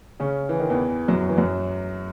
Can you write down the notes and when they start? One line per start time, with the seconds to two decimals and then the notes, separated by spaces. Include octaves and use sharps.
0.20 C#3 C#4
0.49 E3
0.60 D#3
0.70 E2 E3
1.08 F#2 F#3
1.29 E3
1.38 F#2 F#3